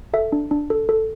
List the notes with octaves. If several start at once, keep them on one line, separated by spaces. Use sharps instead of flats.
A4 E5
D4
D4
A4
A4